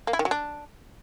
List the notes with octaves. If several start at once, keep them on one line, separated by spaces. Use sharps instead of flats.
A#3
E4
D#3
F#3
D4